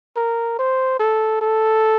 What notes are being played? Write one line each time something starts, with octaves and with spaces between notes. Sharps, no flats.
A#4
C5
A4
A4